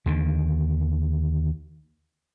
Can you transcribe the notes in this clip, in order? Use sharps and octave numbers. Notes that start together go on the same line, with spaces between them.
D#2 D3 D#3